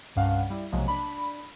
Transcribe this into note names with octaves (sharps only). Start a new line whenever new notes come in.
C2 G2 C#4 F5 F#5
G3 E4
B1 C3 F3 F#3 G#3 A#3
D4 B5